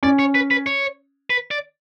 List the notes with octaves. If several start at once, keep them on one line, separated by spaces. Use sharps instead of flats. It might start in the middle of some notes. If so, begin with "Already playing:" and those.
C#4 D5
C#5
B4
B4
C#5
B4
D5